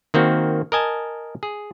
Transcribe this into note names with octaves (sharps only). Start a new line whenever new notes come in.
D#3 A#3 C4 F#4
A#4 D#5 G#5 A5
G#4